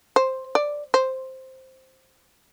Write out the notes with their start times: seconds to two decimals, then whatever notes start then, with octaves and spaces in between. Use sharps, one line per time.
0.16 C5
0.55 D5
0.94 C5